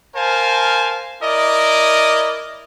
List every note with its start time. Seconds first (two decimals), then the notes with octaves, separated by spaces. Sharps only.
0.15 A#4 C5 F5 G#5 A5
1.22 E4 A#4 D5 D#5